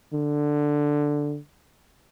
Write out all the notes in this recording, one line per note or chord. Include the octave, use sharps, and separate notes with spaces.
D3